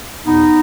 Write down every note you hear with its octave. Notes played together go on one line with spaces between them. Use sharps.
E2 B2 B3 D#4